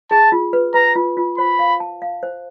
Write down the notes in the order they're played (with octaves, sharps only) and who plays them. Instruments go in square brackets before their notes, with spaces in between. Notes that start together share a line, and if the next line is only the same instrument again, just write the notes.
[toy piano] G#4 [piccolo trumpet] A5
[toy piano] F4
B4
[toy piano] B4 [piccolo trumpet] A#5
[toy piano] F4
F4
[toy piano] C5 [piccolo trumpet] B5
[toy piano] F5
A5
F5
C5